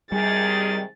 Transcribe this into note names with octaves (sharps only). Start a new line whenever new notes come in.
C3 D#3 G3 G#4 A6